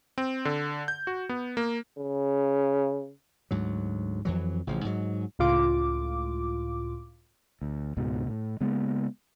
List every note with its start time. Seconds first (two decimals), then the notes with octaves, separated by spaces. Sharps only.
0.18 C4
0.45 D3
0.88 G6
1.07 F#4
1.29 B3
1.57 A#3
1.99 C#3
3.51 D2 G#2 F#3
4.25 F2 E3 F#3
4.67 A1 C#3 F3
4.85 G#2 F#3
5.39 C#2 A2 F4 D6
7.62 D2
7.97 C#2 G#2 B2
8.28 A2
8.61 C#3 G#3 A#3 B3